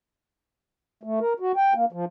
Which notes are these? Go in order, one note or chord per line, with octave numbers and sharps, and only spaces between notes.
A3
A#4
F#4
G5
A#3
F3